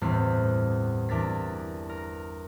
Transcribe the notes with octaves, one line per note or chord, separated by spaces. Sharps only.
G1 E2 A2 C4 F6 B6
E2 D4 A#4 A6 B6
A#4